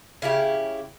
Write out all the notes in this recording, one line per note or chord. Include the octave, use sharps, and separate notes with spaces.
C#3 E4 F#4 G4